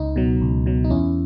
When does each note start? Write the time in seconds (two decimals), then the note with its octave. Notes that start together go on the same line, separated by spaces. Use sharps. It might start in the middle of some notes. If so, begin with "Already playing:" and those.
Already playing: C#2 D#4
0.16 B2 F#3
0.41 C#2
0.66 B2 F#3
0.84 D#4
0.90 E2 C#4 E4